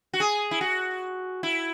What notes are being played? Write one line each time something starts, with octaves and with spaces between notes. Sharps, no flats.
F#4
G#4
E4
F#4
E4